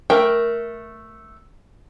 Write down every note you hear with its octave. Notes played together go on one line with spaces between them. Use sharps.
A3 A#4 G5